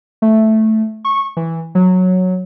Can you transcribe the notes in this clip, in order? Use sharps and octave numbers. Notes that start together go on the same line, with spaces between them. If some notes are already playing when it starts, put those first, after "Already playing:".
A3
C#6
E3
F#3